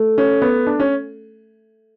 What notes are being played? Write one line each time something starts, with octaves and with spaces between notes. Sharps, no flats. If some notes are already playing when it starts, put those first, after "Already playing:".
Already playing: A3
C#4
B3
D4
C#4